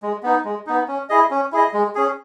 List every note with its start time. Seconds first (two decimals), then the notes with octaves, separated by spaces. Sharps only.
0.03 G#3
0.23 B3 D#4
0.45 G#3
0.67 B3 D#4
0.88 C#4
1.10 E4 G#4 D#5
1.31 C#4
1.52 E4 G#4 D#5
1.74 G#3
1.95 C#4 G#4